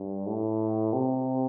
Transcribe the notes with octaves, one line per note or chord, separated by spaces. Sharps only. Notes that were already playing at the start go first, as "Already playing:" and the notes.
Already playing: G2
A2
C3